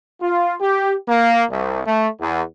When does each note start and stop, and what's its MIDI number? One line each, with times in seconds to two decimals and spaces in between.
0.21 0.54 65
0.60 0.93 67
1.08 1.43 58
1.50 1.79 36
1.85 2.07 57
2.20 2.42 40